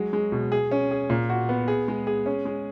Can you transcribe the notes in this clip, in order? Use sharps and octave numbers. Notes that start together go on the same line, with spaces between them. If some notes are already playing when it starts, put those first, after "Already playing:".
Already playing: F#3 G#3
G#3
B2
G#4
C#4
G#4
A#2
F#4
B3
G#4
G#3
G#4
C#4
G#3